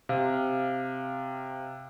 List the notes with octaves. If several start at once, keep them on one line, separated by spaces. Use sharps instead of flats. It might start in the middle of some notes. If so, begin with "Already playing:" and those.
C3 F5